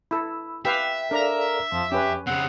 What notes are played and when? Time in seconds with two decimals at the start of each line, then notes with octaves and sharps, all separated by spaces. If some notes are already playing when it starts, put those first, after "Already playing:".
0.11 E4 A4 B5 E6
0.65 G4 B4 E5 F5 G5
1.11 D4 A4 A#4 D5 F5 A#5
1.72 F2 F3
1.92 C#4 G4 B4
2.27 C#3 C4 F#5